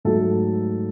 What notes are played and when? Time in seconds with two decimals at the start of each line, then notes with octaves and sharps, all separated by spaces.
0.05 G#2 F#3 A3 A4